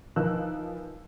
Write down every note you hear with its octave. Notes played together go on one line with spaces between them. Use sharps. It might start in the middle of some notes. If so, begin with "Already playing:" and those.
E3 F3 D#4 A#4 E6 F#6